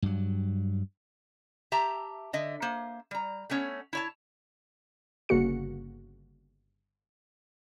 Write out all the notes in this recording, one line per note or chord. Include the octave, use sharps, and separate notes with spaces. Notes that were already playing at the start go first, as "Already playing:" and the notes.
G2 F#3
G4 E5 A5 A#5
D3 D#5 E5
A#3 C5
G3 A#5
A3 B3 C#4 C#5
E4 C#5 A5
G1 C#3 A#3 F#4 C#7